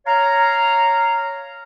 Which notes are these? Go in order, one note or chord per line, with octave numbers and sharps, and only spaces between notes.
C#5 F5 A#5